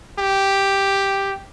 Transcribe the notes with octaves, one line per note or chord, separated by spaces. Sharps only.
G4